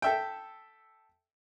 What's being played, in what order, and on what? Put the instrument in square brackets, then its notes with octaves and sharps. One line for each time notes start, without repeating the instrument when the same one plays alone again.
[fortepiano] A4 E5 G5